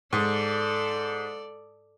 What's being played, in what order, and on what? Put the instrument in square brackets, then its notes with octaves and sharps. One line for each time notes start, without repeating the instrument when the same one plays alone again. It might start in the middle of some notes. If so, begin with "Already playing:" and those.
[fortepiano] G#2 [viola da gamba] A4 D5